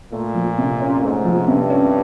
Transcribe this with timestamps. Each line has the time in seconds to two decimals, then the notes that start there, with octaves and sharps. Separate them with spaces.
0.12 A#2 A3
0.35 F3
0.58 C3
0.81 C#4
1.02 G#2 A3
1.25 F3
1.48 G2 C3
1.70 C#4